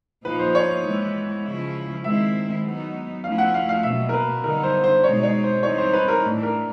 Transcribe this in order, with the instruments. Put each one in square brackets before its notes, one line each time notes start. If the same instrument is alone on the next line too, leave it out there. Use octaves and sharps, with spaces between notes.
[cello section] A#2 F3 A#3 D#4 [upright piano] B4
[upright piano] C5
C#5
[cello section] E3 G#3 B3 E4
C#3 F3 G#3 C#4 E4
[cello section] D#3 G#3 C4 E4 [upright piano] E5
[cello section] F#3 B3 D#4
[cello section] F3 A3 C#4 E4 [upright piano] F5
[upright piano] F#5
F5
F5
[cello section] B2 F#3 A#3 C#4 [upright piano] E5
[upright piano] A#4
B4
[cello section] D3 G3 B3 D#4 [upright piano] A#4
[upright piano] C5
C5
[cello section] B2 G#3 C4 D#4 [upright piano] C#5
[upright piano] C#5
C5
[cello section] E3 G3 C4 D#4 [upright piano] C#5
[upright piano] C5
B4
A#4
[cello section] A2 E3 A3 D4
[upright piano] A#4